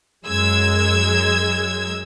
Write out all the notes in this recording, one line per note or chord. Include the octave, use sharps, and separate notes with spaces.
F#2 G#3 E6 G#6